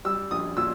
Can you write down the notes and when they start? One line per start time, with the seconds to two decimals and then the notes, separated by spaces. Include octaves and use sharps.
0.05 G3 E6
0.31 A#1 D#6
0.57 A#2 E6